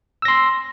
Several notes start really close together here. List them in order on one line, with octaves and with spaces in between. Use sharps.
E6 A#6 C6